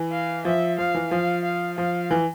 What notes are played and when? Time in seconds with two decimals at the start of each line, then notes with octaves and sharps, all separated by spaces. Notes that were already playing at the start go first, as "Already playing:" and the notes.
Already playing: E3
0.12 F5
0.45 F3 E5
0.78 F3 F5
0.94 E3
1.11 F3 F5
1.44 F5
1.78 F3 F5
2.11 E3